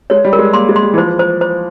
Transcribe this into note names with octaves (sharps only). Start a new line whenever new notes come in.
G#3 C#5
G3
A#4
G#3
A#3 C6
G#3
C6
G3
E3
F3 C5
C5
C5